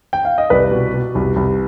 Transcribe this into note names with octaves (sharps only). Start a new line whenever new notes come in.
G5
F5
D#5
C2 B4 D5
B2
B2
C2
C2